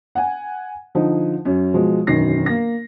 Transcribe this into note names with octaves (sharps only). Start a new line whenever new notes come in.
F#5 G#5
D3 F3 D#4
F#2 C#4
B2 F3 G#3
E1 F#2 D#3 A#6 C7
A#3 A#6